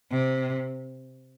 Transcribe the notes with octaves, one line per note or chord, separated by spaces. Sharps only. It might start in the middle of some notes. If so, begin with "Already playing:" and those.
C3